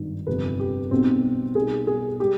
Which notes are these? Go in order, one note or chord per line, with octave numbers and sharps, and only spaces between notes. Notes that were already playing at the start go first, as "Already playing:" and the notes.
Already playing: G#1 G2 D#3 G3
G1 F2 C3 G3 B4
G4
B1 B2 G3 C4
B1 B2 G3 G#4
G#4
G3 G4